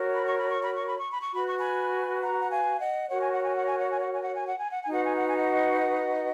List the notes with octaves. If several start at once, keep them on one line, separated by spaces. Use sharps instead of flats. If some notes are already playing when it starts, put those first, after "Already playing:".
Already playing: F#4 A#4 C#5
B5
C#6
B5
C#6
B5
C#6
B5
C#6
B5
C#6
F#4 B4 B5
C#6
G#5 B5
F#5 A#5
F#5
F5 G#5
D#5 F#5
F#4 A#4 C#5 F#5
G#5
F#5
G#5
F#5
G#5
F#5
G#5
F#5
G#5
F#5
G#5
F#5
G#5
F#5
G#5
D#4 F#4 B4 F#5
G#5
F#5
G#5
D#5 F#5